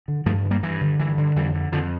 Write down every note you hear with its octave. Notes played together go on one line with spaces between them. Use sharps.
D3
G2 F3 A3
D3
G3 A#3
G2 E3
D3
G2 E3
D3
F2 E3 G3
D3
F2 D3 F3